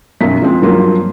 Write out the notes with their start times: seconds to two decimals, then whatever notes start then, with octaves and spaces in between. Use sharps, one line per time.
0.21 B1 F#2 B6
0.42 F3 G#3 C4
0.62 G2 F3 F#3 A#3 F4